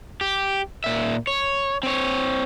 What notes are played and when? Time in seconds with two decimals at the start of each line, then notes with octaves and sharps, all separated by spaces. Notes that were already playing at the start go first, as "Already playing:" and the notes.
0.21 G4
0.84 A#2 E5
1.27 C#5
1.83 C4 C#5